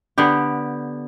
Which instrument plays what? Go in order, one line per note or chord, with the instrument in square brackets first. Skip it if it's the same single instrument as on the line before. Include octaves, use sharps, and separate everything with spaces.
[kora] D3 B3 G4